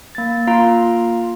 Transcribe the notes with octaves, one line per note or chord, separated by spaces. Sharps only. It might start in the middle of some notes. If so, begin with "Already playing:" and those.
A#3 A6
A#3 F4 F5 A#5 C6 D7